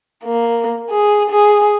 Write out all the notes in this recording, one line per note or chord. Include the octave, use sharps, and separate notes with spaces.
A#3
G#4
G#4